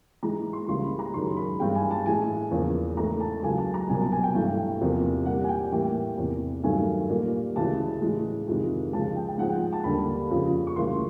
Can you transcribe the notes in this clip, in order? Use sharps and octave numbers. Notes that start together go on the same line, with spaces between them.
G#2 E3 G#3 A#5
C6
C#2 C#3 E3 G3 A#3 C6
B5
A#5
F#2 D#3 G#3 C6
B5
G2 E3 G#3 G5
G#5
A5
A2 E3 G#3 G#5
E2 C#3 F3 A#3
G#2 E3 A3 A#5
A5
C#2 C#3 F#3 A#3 G#5
A5
A#5
C2 B2 F#3 A#3 G#5
A5
G#5
G5
G2 E3 A3 G5
E2 C3 F3 A#3
A#2 G3 A#3 F#5
G#5
G5
A2 E3 G3 A#3 G5
E2 C3 E3
G2 D#3 F#3 A3 G#5
A#2 G3 A#3
D2 C#3 E3 G#3 A5
A2 E3 G#3
F2 C3 D#3 G#3
C#2 C#3 F3 G#3 A5
G5
G5
G#2 F3 G#3 F#5
G5
A5
D#2 D3 G3 A#3 B5
F2 C#3 F3 A#3
C#6
D2 C#3 E3 G3 A#3 C6